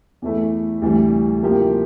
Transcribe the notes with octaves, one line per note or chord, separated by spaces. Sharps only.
E2 E3 A3 E4
D2 C3 E3 G3
C3 F3 A#3 E4 G4